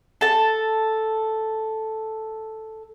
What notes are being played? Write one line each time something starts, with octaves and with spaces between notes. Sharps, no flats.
A4 A5